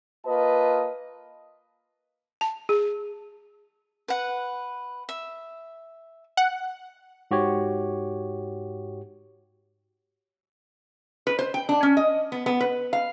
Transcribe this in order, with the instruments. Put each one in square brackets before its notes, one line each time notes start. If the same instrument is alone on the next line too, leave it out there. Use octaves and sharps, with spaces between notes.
[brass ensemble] A#3 F4 B4 D#5 A5
[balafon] A5
G#4
[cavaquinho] B4 F#5
E5
[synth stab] F#5
[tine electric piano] G#2 F#4 G4 C#5
[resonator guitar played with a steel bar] B4
C5
G5
D4
C#4
D#5
B3
B3
B4
F5